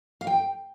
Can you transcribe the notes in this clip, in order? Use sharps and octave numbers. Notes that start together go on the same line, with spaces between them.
F5
G5